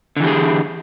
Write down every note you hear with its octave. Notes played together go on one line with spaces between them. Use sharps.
D3 E3 G4 G#4